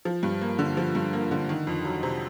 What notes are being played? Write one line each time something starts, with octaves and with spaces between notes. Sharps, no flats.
F3
G2
A#3
D3
F3
G2
A#3
D3
D#3
F2
F#3
C3